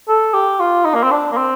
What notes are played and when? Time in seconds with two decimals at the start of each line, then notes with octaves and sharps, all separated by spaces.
0.08 A4
0.34 G4
0.60 F4
0.85 D#4
0.94 A#3
1.03 C4
1.11 D4
1.32 A#3
1.37 C4